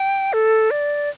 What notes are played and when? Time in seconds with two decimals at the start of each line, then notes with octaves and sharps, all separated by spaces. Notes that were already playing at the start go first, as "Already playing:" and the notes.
Already playing: G5
0.33 A4
0.71 D5